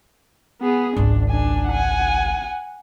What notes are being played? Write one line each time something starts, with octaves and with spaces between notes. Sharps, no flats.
B3 G#4
G#1 C#2 D4
D4 G#5
F#5 G#5